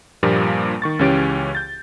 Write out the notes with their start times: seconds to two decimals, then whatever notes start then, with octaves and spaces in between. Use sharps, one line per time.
0.23 G2 A#2 F3 G3 A#3
0.82 D#3 C#6 A6
0.99 C#2 E3 C#4 G4 A6 D7
1.55 G6 A6